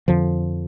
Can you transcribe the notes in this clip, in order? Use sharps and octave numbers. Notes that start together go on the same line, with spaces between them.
F2 D3 F3